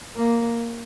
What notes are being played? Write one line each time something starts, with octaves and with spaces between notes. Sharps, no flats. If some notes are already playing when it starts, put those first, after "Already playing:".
A#3